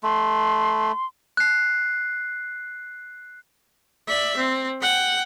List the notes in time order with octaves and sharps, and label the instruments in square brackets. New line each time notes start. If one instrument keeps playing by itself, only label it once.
[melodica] A3 [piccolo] C6
[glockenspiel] F#6 C7
[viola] D5 E5
C4
F#5 G5